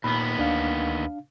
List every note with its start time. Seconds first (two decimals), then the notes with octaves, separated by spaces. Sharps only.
0.04 D#2 A#2 B3 B5
0.39 D2 D4 F5